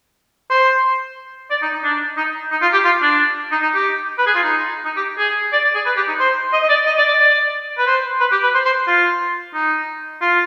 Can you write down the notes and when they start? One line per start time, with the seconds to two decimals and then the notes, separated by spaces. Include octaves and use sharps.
0.50 C5
1.51 D5
1.63 D#4
1.74 D#4
1.84 D4
2.18 D#4
2.52 D#4
2.62 F4
2.73 G4
2.85 F4
3.02 D4
3.52 D#4
3.63 D#4
3.75 G4
4.18 B4
4.27 G#4
4.35 F4
4.43 D#4
4.85 D#4
4.97 G4
5.19 G#4
5.53 D5
5.64 D5
5.75 G#4
5.86 B4
5.97 G4
6.08 D#4
6.20 C5
6.53 D#5
6.63 D#5
6.69 D5
6.87 D#5
6.98 D5
7.08 D5
7.20 D5
7.78 B4
7.87 C5
8.20 B4
8.32 G4
8.43 B4
8.54 C5
8.65 C5
8.87 F4
9.54 D#4
10.21 F4